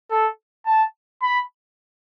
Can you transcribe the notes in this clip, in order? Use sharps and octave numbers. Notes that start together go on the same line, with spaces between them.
A4
A5
B5